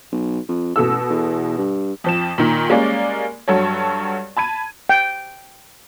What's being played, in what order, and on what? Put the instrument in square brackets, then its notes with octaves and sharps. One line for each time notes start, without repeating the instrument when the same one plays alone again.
[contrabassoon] B1
F2
[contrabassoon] A1 [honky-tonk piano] B2 A4 E6
[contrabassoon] E2
G2
[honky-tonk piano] F2 F3 E7
A#2 D#3
G3 G#3 A#3 C#4 A#4 D5
G2 F#3 A4 C#5
A5 B5 G#6 D#7
[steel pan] G5